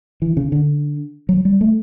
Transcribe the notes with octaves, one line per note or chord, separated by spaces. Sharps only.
E3
C#3
D3
F#3
G3
A3